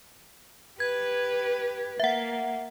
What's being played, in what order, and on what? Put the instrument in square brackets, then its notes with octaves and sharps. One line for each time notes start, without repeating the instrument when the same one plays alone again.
[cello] G4 B4 [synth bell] G#6
[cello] A#3 [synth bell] E5 F#5